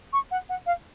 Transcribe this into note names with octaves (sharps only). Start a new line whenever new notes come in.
C#6
F#5
F#5
F5